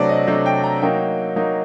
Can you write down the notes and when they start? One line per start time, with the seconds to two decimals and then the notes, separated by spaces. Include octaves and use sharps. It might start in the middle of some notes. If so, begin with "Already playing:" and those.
Already playing: C3 F#3 A3 D4 D5
0.09 D#5
0.27 C3 F#3 A3 D4
0.46 G5
0.64 A#5
0.82 F#3 A#3 D#4 G5
1.36 F#3 A#3 D#4